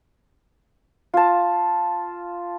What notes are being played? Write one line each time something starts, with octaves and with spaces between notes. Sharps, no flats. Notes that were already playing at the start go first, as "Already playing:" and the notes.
F4 A5